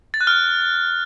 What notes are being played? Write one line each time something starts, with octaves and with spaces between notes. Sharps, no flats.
A6
F#6
F6